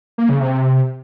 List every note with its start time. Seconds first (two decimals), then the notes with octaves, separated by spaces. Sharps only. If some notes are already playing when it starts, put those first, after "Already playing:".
0.18 A#3
0.29 C#3
0.40 C3